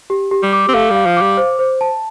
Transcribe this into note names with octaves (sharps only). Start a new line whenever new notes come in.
G4
G4
G3
D6
C4
A3 F5
G3 F5
F3
G3 D6
C5
C5
A5